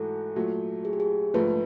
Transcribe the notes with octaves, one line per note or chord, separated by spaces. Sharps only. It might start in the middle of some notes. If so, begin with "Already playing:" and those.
Already playing: G#2 E3 A3 F#4 A4
A#2 F#3 A3
G#4
G4
G#4
A#1 G#2 F3 A3 B4